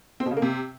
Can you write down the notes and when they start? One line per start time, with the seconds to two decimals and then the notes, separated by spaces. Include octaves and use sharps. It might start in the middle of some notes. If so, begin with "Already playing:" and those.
0.20 C4
0.26 B2
0.31 C#3
0.37 A#3
0.42 C3